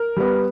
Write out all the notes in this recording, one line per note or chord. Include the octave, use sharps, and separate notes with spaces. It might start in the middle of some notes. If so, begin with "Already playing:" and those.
Already playing: A#4
G3 B3